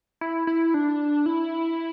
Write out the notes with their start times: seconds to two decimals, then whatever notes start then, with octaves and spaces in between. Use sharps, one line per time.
0.21 E4
0.47 E4
0.74 D4
1.26 E4